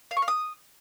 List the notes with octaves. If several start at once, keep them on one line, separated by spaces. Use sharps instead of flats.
F5
C#6
F5
D#6